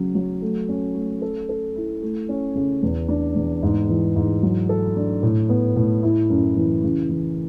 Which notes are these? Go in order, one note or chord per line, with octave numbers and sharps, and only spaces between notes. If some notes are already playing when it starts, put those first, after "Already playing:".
Already playing: C#3 F#3 C#4
F#3
A3
C#4
A3
A4
A4
E4
A3
C#4
C#3
E2
D4
E2
G#2
E3
G#2
F#3
A4
D4
A2
B3
A2
E4
F#2
E3
C#3
E3